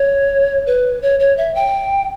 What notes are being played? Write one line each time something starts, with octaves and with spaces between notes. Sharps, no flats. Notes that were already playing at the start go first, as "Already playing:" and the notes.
Already playing: C#5
B4
C#5
C#5
E5
G5